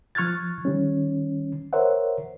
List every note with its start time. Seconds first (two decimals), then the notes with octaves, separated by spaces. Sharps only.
0.15 F3 C#6 F6 F#6 G#6 A6
0.65 D#3 G3 C#4
1.73 A#4 C5 C#5 E5 F#5